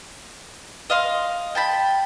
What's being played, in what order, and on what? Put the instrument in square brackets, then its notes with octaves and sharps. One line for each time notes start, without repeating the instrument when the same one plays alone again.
[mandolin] D#5 F5 C6
G5 A5 B5